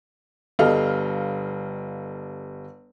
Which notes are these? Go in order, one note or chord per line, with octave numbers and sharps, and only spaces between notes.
G1 G3 A4 D#5 F5 F6